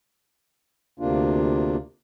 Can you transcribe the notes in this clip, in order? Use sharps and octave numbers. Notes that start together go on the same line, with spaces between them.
D2 C3 A#3 D4 F4